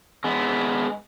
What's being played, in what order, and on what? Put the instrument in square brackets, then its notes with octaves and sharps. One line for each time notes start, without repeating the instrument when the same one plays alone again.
[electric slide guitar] G#3 B3